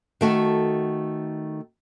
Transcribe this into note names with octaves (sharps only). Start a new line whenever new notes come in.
D#3 A3 F#4 A4